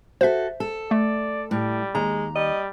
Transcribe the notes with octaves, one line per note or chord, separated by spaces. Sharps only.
F#4 A4 C5 E5
A4
A3 D5
A2 G3
D#2 G#3 A#5
G3 D#5